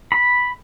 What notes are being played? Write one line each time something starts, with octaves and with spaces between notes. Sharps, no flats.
B5